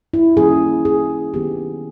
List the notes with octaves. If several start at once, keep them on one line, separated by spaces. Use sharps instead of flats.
E4
D#3 G3 A#3 C#4 G#4
G#4
D#3 F#3 B3 G4